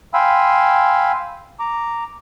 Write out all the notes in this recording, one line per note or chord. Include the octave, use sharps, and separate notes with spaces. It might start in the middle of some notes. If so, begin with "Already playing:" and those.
F5 G5 G#5 B5 C6 E6
A#5 D6